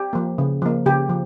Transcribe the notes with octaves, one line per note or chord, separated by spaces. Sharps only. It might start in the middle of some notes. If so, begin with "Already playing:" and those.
Already playing: G4
F3 A#3
C#3
F3 A#3
C#3 G4
F3